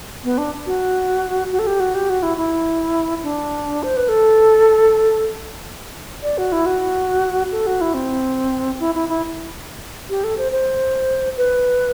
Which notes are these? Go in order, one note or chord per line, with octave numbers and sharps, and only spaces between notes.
B3
D4
F#4
F#4
A4
G4
F#4
G4
F#4
E4
E4
D4
C5
B4
A4
D5
F#4
E4
F#4
A4
F#4
E4
C4
E4
E4
E4
G4
A4
C5
C5
B4